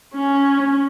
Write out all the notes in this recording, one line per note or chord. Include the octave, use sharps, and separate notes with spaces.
C#4